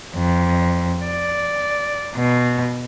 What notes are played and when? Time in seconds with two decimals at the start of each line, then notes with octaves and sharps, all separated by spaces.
0.14 F2
1.05 D5
2.15 B2